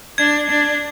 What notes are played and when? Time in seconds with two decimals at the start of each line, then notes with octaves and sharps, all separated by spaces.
0.18 D4 G#6
0.50 D4